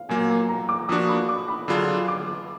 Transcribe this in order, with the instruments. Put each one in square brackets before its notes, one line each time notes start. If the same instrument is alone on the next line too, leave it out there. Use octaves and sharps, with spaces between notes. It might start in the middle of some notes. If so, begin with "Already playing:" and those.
Already playing: [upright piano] F5
[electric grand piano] A#2 F#3 A#3 [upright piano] G#5
[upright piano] A#5
A#5
D6
[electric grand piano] F3 A#3 D4 F#4 [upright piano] D#6
[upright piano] B5
D6
B5
[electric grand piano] D3 F#3 D4 F4 G#4 [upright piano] B5
[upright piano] D6